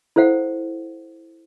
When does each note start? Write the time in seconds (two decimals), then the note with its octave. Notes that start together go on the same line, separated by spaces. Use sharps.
0.16 E4 A4 C5 F5 F#5